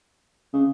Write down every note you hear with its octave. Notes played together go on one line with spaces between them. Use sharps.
C#3